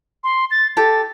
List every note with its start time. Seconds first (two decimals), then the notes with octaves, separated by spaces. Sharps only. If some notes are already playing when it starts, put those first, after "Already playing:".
0.24 C6
0.51 A6
0.77 G4 A4 A6